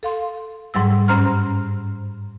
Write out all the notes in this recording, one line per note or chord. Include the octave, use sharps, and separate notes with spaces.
A4 F5 C6
G#2 F#3 G3 E6
G2 C#4 C5 A#5 C6 F6